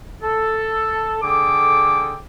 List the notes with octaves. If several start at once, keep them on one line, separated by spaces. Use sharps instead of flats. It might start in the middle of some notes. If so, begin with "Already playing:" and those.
A4
D3 G#4 A4 G5 D6